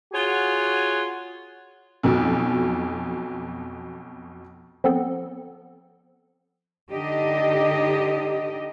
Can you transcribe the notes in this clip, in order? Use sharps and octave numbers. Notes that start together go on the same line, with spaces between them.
F4 F#4 G#4 C#5 F#5 G#5
B1 F2 B2
F3 B3 C4 A4
D3 D#4 G4 D#5